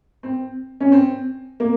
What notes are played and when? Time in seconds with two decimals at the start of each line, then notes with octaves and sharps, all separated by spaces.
0.23 C4
0.80 C#4
0.92 C4
1.60 A#3